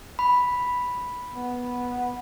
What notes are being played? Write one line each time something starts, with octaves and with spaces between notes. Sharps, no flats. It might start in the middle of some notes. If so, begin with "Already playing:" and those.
B5
B3